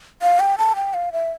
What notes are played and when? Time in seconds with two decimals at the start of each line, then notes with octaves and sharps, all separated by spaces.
0.22 F5
0.40 G5
0.58 A5
0.76 G5
0.94 F5
1.12 E5